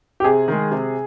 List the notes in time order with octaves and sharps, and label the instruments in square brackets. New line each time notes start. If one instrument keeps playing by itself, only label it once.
[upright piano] G4
[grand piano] C3 [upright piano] G#4
[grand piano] D#3 G#3
C3